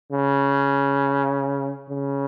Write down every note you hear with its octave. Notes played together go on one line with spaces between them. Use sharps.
C#3
C#3